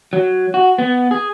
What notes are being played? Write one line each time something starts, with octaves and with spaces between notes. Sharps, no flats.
F#3
F#4
B3
G#4